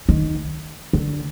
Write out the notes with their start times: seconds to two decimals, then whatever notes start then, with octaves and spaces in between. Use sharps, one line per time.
0.09 D#3
0.93 D3